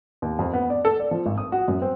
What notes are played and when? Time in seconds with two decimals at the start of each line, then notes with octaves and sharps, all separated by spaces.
0.22 D#2
0.39 F2
0.53 B3
0.70 D5
0.85 A4
1.00 D5
1.11 F3
1.26 G#1
1.38 D#6
1.52 F#4
1.68 F#2
1.82 C4